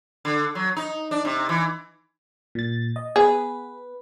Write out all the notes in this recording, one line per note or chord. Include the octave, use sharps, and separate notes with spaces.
D3
F#3
D#4
D4
C3
E3
A#2 A6
D#5
B3 G#4 B4